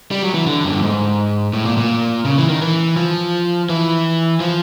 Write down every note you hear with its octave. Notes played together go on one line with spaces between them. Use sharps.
G3
F#3
E3
D3
F#2
G2
G#2
A2
A#2
A#2
C#3
E3
D#3
E3
F3
E3
F3